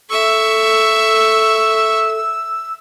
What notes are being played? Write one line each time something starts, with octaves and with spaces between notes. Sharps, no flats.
A4 E5 C#6 E6